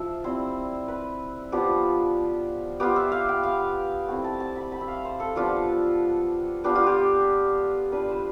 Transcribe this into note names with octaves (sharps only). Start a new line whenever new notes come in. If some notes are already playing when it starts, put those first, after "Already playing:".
Already playing: F3 E5
G3 C4 E4 C5
B4
F3 B3 D4 F4 G4
B3 F4 G4
E5
F5
G5
F5
A3 C4 E4 G5
A5
A5
B5
B5
E5
F5
C5
A4
F3 B3 D4 F4 G4
B3 D4 F4 G4
F4
G4
G3 D4 F4 B4
C5